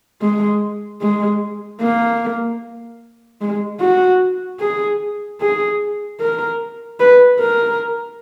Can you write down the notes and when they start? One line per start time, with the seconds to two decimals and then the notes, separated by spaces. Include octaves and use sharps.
0.22 G#3
1.02 G#3
1.81 A#3
3.41 G#3
3.81 F#4
4.60 G#4
5.41 G#4
6.21 A#4
7.00 B4
7.40 A#4